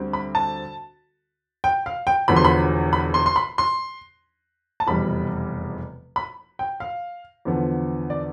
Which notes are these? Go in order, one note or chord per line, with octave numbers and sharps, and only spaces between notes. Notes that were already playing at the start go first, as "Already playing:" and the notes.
Already playing: D2 D3 G3 C4
B5
A5
G5
F5
G5
E1 E2 D3 F3 B3 B5
C6
B5
B5
C6
C6
B5
C6
A5
F1 E2 B2 G3 B5
B5
G5
F5
E2 D3 F3 B3
D5